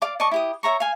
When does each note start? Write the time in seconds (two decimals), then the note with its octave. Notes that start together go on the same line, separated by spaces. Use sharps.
0.02 D5 F5 D6
0.20 D5 D#5 A5 C#6
0.31 E4 G4 D#6
0.63 C#5 E5 A#5 C#6
0.80 F5 G#5